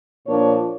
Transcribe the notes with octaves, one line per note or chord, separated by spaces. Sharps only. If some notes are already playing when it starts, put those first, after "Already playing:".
A#2 F3 A#3 D4 C#5